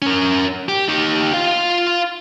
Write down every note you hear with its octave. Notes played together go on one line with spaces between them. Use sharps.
C#4 A#4
G4
D#4 G4
F4 F5